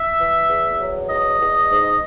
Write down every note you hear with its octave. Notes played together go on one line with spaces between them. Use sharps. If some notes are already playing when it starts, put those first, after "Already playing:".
Already playing: E5
E3
E2
F#3
E2 D#5
E2
G#2